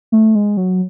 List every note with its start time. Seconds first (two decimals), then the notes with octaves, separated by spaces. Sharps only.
0.12 A3
0.35 G#3
0.57 F#3